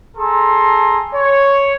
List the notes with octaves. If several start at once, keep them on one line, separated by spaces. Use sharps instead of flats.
G#4 A4 A#5 C6
C#5